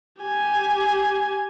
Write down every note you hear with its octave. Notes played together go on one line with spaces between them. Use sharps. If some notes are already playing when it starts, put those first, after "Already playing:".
G4 G#5